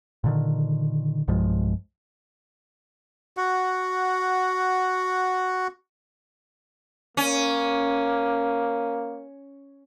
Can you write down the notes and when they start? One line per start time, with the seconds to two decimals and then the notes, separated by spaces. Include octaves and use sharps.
0.24 A#2 D3 D#3
1.28 B1 G2 F3 G#3
3.37 F#4 F#5
7.17 A#3 C#4